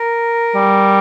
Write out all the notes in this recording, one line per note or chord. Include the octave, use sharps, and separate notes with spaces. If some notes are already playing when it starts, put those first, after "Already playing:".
Already playing: A#4
G3